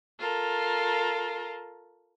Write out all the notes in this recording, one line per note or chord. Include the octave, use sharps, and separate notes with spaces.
F4 A4 A#4